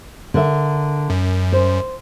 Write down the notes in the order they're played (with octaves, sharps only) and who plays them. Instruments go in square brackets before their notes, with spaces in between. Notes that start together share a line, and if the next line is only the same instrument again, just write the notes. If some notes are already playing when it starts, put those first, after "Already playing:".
[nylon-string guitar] D3 A#4 E5
[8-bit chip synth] F#2
[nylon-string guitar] C5